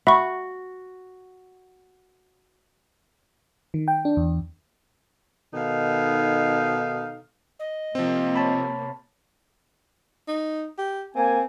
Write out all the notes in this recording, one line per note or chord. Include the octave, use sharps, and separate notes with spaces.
F#4 E5 B5 C#6
D#3
G5
D4
E2
B2 D#3 D#4 A4 F5
D#5
C3 F3 A#3 C4
C#5 A5 B5
D#4
G4
A#3 C4 G#5